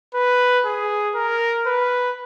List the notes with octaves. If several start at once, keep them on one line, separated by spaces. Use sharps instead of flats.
B4
G#4
A#4
B4